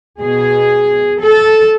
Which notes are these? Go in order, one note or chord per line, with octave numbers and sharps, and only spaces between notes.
B2 G#4
A4